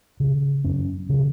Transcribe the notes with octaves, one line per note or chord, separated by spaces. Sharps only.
C#3
F#2 C#4
C#3